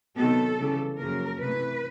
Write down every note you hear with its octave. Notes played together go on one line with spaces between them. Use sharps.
C3 D#3 F#3 B3 A4
C#3 E3 G3
F#2 C#3 F3 A#3 A#4
C3 E3 A3 B4